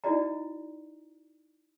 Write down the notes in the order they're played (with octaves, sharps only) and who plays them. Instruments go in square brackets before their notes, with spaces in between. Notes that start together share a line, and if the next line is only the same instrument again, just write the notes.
[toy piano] D#4 E4 F#4 D5 D#5 A#5